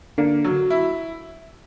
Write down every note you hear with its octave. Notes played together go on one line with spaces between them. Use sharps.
D3 A#3
F#3
E4